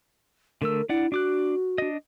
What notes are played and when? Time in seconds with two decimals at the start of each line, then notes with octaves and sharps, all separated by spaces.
0.62 D3 A3 A#4 E6
0.89 D4 E4 D5 F#5
1.12 D4 F#4 D6 F#6
1.78 D4 D#5